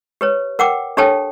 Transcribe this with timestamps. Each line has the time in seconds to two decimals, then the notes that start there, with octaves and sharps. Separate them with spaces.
0.21 G4 B4 C#5
0.59 A#4 F#5 G5 D6
0.97 D4 G4 A4 C#5 G5 A5